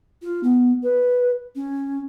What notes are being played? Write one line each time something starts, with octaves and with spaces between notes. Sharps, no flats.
F4
B3
B4
C#4